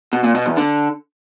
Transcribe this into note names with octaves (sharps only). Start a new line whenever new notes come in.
B2
A#2
B2
E2
D3